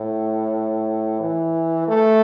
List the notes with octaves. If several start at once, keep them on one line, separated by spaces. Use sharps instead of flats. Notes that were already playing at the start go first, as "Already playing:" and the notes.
Already playing: A2
E3
A3